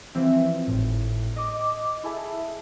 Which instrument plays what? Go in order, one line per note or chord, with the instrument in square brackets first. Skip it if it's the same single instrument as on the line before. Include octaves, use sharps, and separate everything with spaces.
[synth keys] E3 F3 G3 C4 E5
G#1 A2
D#5 D6
E4 G#4 A4 E5